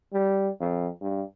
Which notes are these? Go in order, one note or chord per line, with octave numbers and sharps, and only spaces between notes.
G3
F2
G2